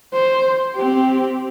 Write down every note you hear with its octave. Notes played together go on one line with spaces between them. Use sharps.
C5
C4 G4